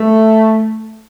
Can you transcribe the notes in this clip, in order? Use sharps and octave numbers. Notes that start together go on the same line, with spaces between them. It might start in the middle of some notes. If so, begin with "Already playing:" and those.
Already playing: A3